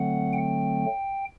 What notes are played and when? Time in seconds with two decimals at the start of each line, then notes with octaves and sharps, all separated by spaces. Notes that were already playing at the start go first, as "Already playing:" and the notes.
Already playing: D3 F#3 A3 C4 F#5
0.33 G5